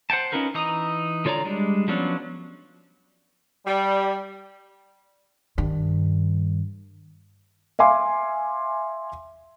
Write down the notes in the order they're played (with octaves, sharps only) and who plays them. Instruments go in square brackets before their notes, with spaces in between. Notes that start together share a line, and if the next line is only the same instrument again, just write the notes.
[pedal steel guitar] C5 F#5 G5 A5
C#4 D#4 F4 A#4 B4
E3 D#4 A#5 D#6
D3 F4 C#5 D5 A#5
G3 G#3 D4
F3 F#3 B3 C#4 D4
[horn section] G3
[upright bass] G2 D#3
[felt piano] E5 F5 G#5 C6 D6